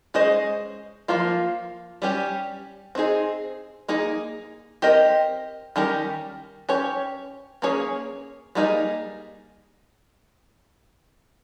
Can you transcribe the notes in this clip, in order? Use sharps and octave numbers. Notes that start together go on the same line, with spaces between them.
G#3 C#4 G#4 C5 D#5
F3 A#3 F4
G3 C#4 G4
C4 D#4 G#4
A#3 D#4 G#4
C4 G4 A#4 D#5
D#3 G3 C#4 G4 A#4
C#4 G4 C#5
A#3 C#4 G#4 C#5
G3 A#3 D#4 G#4